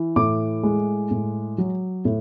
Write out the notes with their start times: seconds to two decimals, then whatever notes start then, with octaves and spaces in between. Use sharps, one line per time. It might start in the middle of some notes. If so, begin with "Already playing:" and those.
Already playing: E3
0.16 A2 D6
0.63 G#3
1.11 A2
1.58 F#3
2.05 A2